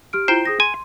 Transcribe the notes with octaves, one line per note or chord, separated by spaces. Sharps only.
G4 F6 D7
E4 F4 C5 G5 A#5
G#4 D#6 A#6
G#5 C6